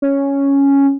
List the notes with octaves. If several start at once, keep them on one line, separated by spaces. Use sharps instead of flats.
C#4